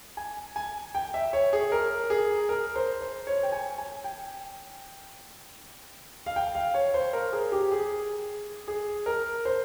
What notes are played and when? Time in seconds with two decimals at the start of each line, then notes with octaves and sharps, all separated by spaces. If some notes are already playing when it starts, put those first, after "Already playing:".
0.17 G#5
0.56 G#5
0.95 G5
1.14 E5
1.33 C#5
1.53 G#4
1.72 A#4
2.10 G#4
2.49 A#4
2.76 C5
3.01 C5
3.27 C#5
3.43 G5
3.52 G#5
3.78 G#5
4.04 G5
6.26 F5
6.36 G5
6.55 F5
6.74 C#5
6.94 C5
7.13 A#4
7.32 G#4
7.52 G4
7.72 G#4
8.68 G#4
9.06 A#4
9.45 C5